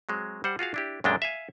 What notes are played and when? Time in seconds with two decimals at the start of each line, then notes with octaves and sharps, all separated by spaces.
0.09 F#3 G#3 C4
0.44 G3 C5 F#5
0.59 F4 F#4 G#4 F5
0.74 D4 E4 G4
1.04 F#2 A#2 G#3 A3 D4 G5
1.22 E5 F5 G#5